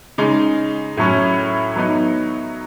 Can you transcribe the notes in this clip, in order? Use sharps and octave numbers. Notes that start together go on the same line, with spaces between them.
C#3 G#3 D#4
A2 F#3 C#4
F#3 B3 D#4